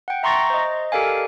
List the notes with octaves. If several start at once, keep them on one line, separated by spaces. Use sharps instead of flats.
F#5 G5
E5 A#5 C6 C#6 A6 A#6
C5 D#5
G4 A4 A#4 D5 F5 G#5